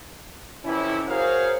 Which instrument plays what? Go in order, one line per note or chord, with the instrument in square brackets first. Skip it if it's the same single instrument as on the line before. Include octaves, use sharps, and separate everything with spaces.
[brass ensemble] F2 C3 E3 C#4 E4
F#4 G#4 A#4 C5 C#5 F5